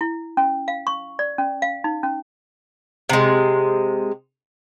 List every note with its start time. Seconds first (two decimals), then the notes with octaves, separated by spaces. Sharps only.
0.01 E4
0.37 C#4
0.68 F5
0.87 C#6
1.19 D5
1.38 C#4
1.62 F5
1.84 D#4
2.03 C#4
3.09 C3 G#3